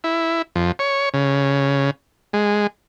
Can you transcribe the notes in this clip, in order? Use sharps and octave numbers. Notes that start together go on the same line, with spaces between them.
E4
F2
C#5
C#3
G#3